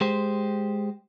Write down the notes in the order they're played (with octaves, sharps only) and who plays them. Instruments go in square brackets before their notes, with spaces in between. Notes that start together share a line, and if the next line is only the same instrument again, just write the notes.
[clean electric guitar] G#3 G4 C5